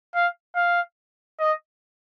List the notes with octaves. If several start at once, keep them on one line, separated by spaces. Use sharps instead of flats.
F5
F5
D#5